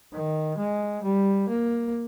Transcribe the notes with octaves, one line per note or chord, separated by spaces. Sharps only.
D#3
G#3
G3
A#3